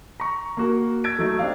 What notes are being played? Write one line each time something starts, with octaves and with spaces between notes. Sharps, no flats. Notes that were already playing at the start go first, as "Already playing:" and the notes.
A#5 C#6
A#3 F#4 A#4
E6 G#6 A6 D7
F#3 A3 D#4
C4 D4 G4 D5 F5